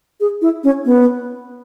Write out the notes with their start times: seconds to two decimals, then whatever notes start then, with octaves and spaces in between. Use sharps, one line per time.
0.20 G#4
0.42 E4
0.64 C#4
0.85 B3